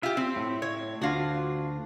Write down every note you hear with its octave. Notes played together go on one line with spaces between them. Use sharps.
F4 G4 E5
C4
A2
C#5
D2 D4 F4 F#4 F5